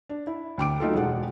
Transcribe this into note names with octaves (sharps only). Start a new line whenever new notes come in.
D4
E4
D2 G5 D6 D7
F#3 A3 D#4 F4 A4
E1 G#3 F#5